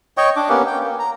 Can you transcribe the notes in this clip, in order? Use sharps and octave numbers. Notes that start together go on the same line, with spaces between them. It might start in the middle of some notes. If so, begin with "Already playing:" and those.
C#5 D#5 G5 C#6
D4 D6
A#3 B3 C#4 G4
G5
A#3
A#5